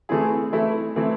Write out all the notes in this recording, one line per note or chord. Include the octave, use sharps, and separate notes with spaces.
E3 A3 C4 E4 G#4
E3 A3 C4 E4
E3 A3 C4 E4